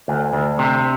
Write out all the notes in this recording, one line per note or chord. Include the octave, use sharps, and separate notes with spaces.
D2
D2
C3